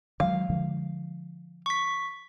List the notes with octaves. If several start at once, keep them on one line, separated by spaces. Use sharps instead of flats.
D#3 F#3 G#3 F5
D3 F3 G#3
C#6 B6